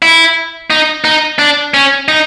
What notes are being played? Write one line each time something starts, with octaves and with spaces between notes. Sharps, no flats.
E4
D#4
D#4
D4
C#4
D#4